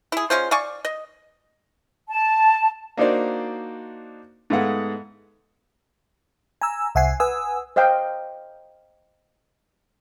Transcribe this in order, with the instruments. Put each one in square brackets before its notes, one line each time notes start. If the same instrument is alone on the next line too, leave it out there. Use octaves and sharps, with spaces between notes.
[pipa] E4 G#4
G#3 C#4 F4 C5
D5 F5 G#5 C#6
D#5
[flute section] A5
[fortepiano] A#3 D4 D#4 F#4 C5 D5
G#2 G#3 A3 B3 F5 F#5
[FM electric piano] G#5 A#5 E6
C2 E5 F#5 G#5 C7
B4 F#5 G#5 D#6 E6
[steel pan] C5 D#5 F5 G5